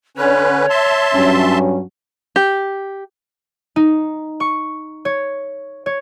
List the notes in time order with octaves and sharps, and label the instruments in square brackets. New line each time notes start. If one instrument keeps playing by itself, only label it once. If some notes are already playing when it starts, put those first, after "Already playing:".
[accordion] D3 C#4 B4 [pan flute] C#5
[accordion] E5 A5 C6
[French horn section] G2 F#3 C#4
[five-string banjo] G4
[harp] D#4
C#6
C#5
C#5